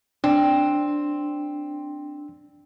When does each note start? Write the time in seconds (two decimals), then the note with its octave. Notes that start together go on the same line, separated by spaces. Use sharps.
0.24 C4 D4